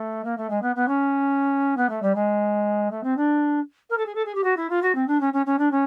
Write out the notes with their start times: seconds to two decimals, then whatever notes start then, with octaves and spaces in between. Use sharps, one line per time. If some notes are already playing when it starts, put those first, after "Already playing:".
Already playing: A3
0.24 A#3
0.37 A3
0.50 G#3
0.62 B3
0.75 B3
0.88 C#4
1.77 B3
1.89 A3
2.02 G3
2.15 G#3
2.91 A3
3.03 C4
3.17 D4
3.90 A#4
3.97 A4
4.06 G#4
4.15 A4
4.25 G#4
4.35 G4
4.44 F#4
4.56 E4
4.69 F4
4.82 F#4
4.95 C4
5.07 D4
5.20 C#4
5.33 C#4
5.46 C#4
5.58 D4
5.71 C#4